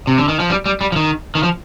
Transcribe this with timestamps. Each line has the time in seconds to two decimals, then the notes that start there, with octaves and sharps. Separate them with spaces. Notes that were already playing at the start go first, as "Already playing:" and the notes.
0.07 C3
0.18 D3
0.28 D#3
0.40 F3
0.50 G3
0.66 G3
0.81 G3
0.92 F3
0.96 D#3
1.35 D#3
1.43 F3